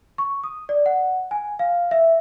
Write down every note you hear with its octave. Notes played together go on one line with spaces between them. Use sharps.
C#6
D#6
D5
F#5
G#5
F5
E5